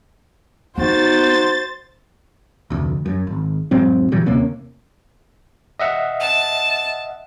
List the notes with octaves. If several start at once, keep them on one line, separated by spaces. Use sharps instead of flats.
B3 D#4 F#4 C5 A6
F1 D2
F#2
G#1
E1 G#2 F#3 C4
A#2 E3 F#3 G3
D#2 C3 A#3 C#4
D#5 E5 F#5
A5